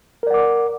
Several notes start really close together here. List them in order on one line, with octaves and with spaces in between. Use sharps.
A#4 D5 F#5 D6